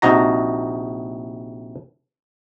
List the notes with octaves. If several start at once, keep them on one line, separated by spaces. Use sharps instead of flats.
A#1 C3 D#4 F#4 A#5